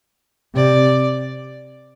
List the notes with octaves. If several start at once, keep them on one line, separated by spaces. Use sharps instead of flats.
C3 D5